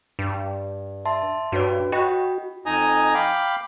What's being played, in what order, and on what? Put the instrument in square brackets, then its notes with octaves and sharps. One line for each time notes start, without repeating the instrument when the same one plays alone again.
[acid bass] G2
[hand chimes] E5 A5 C6
[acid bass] G2 [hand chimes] F#4 B4 C#5
[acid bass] F#4 [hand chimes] D#5 G5 B5
[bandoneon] F2 D#4 D#5 G#5 A#5 D#6
F5 G5 B5 D6